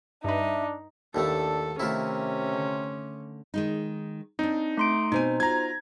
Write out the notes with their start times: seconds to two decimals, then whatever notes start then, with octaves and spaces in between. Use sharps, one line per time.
0.24 G2 D4 D#4 B4 E5
1.15 D#2 A2 A3 D4 E4 A4
1.80 C3 D#3 A3 C#4 E4 F4 E5
2.53 D3 C6
3.54 D#3 G#3 D#4
4.39 C4 D4 D#4
4.77 A3 C6 D7
5.12 B2 C4 D#4 C5 G#5
5.40 F4 F#4 A#5 G#6